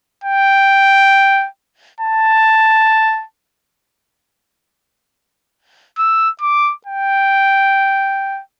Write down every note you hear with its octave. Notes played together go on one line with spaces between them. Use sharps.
G5
A5
E6
D6
G5